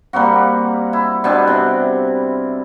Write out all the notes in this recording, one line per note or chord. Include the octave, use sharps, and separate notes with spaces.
G3 A#3 C4 F#4
E4
B2 G3 C4 D4
C3